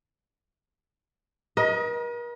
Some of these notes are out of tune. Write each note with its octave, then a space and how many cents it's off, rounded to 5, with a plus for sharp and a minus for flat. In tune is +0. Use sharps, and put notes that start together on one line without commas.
A#4 +45 D#5 +15